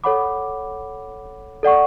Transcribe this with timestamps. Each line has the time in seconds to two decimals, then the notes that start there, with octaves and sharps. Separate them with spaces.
0.04 A4 C#5 F#5 B5 D6
1.63 A4 D5 F#5 C#6